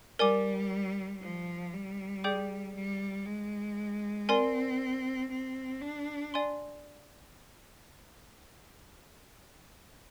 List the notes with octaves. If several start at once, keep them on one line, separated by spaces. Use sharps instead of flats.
G3 A#4 D5 G#5 D6
F3
G3
G#4 D5 G5 D6 G6
G3
G#3
C4 A#4 D5 G#5 C6
C4
D4
D5 G#5 C6